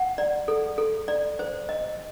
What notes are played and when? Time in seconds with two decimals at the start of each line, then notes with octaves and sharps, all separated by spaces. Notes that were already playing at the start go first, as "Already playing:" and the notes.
Already playing: F#5
0.18 D5
0.48 A4
0.78 A4
1.08 D5
1.39 C5
1.69 D#5